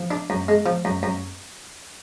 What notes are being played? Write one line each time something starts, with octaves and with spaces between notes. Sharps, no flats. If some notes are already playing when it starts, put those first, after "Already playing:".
Already playing: F3
D4
F#2
G#3
F3
F#2
F#2